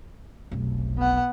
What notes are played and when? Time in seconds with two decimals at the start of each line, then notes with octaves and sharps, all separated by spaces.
0.52 F1 B1
0.98 B3 F#5